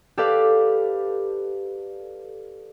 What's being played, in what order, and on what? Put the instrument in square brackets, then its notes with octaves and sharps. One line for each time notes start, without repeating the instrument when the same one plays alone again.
[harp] G4 A4 B4 D5 F5